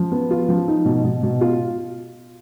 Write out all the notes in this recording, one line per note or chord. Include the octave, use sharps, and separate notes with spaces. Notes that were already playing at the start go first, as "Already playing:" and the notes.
Already playing: F3
B3
F4
F3
D#4
B2
B2
B2
F4